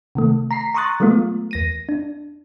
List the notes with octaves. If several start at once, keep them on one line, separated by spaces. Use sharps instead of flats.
C3 D#3 A3
A#5 B6 C7
A#5 C6 C#6 D#6 F#6 A6
F#3 G#3 A3 B3 F4
E2 A#6 D#7
D4